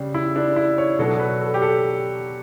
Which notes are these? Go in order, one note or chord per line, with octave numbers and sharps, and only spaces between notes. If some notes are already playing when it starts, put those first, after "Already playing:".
Already playing: C#3 G3 D4
E4
D4
E4
C#5
B2 F#3 B3 D4 A4
B4
A4
G4
A4